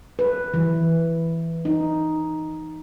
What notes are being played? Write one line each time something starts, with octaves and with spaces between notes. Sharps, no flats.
B4
E3
D#4